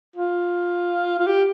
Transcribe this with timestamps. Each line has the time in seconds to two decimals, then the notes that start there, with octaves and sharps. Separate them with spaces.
0.16 F4
1.19 F4
1.27 G4